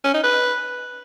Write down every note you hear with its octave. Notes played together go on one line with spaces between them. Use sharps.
C#4
D#4
B4